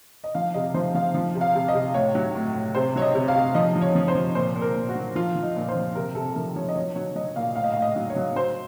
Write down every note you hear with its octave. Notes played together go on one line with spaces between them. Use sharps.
D#5
F3 F5
C3 D#5
F3 C5
F3 F5
F3
C3
F5
C3
D#5
C3
A2 C#5
F#3
A2
A2
C3 C5
F#3 C#5
D#5
C3
F5
C3
F3 D#5
F3
C#5
F3
C5
F3
A#2 C5
A#2
A#4
A#2
F#4
F#3
F3 F4
F3
D#4
A#2
C5
F3
C3 A#4
C3 A4
F3 A#4
F3 C#5
D#5
F#3 C#5
F#3 C#5
F#3 D#5
A#2 F5
A2 F5
D#5
F5
A2
D#5
F#3
C#5
F#3
F#3 C5